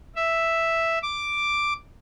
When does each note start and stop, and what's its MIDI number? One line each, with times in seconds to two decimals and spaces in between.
0.16 0.99 76
1.03 1.74 86